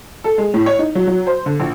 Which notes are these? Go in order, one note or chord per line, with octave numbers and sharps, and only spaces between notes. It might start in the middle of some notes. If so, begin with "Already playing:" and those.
A4
G#3
A2
C#5
D#4
F#3
F#3
C5
D3
A#1